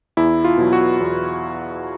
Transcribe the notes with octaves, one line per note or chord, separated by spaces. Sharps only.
E2 E4
F4
B2 F#3
F#4
E2